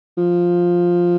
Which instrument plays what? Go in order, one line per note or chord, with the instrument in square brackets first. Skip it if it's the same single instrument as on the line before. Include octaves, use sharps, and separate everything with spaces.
[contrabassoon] F3